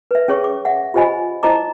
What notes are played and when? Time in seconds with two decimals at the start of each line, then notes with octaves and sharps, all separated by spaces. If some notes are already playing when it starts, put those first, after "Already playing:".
0.11 B4 E5
0.28 C#4 G#4 C#5 C#6
0.44 D6
0.65 E5 F#5
0.94 F4 G4 C5 D#5 G#5 B5
1.43 D#4 E4 C5 D#5 A#5 D6